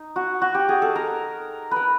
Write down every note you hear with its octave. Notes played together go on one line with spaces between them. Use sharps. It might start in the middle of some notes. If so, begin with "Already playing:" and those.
Already playing: D#4
F#4
F#4
G4
G#4
A4
A#4
A#4 B4